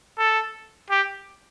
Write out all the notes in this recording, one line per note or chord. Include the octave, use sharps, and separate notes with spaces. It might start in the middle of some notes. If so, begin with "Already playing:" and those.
A4
G4